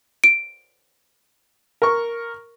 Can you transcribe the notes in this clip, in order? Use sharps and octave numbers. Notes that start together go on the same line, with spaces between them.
D7
A#4 C#6